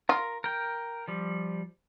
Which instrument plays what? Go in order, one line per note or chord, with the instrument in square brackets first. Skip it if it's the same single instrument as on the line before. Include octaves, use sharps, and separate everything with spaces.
[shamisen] F4 [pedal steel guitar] A#4
[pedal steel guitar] A#4 G5
F3 G3